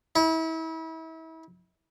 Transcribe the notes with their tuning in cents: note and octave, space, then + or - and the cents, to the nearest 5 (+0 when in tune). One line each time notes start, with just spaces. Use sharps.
E4 -35